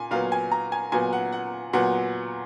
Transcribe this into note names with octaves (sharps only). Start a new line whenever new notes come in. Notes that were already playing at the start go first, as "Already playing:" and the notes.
Already playing: A#2 G#5
A#2 F#3 B3 F5
G#5
A#5
G#5
A#2 F#3 B3 G#5
F#5
F#5
A#2 F#3 B3 F#5